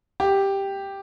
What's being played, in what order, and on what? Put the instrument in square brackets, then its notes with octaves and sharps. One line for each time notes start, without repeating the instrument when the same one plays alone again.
[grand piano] G4